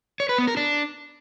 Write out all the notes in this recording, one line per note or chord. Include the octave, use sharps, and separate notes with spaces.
C#5
B4
B3
A#4
D4